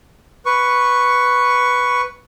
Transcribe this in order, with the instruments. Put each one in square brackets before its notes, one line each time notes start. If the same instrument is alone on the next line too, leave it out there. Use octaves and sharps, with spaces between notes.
[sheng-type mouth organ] B4 C#6